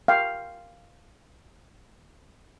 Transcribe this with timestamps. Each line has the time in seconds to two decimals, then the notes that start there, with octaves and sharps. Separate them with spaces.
0.08 F5 G5